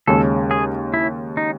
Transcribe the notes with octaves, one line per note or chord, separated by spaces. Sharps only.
D#2 C#3 G#3 C#4 A4
G#4
E4
D#4